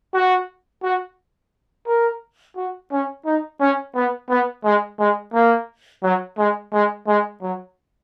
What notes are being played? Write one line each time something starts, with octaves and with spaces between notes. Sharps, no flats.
F#4
F#4
A#4
F#4
C#4
D#4
C#4
B3
B3
G#3
G#3
A#3
F#3
G#3
G#3
G#3
F#3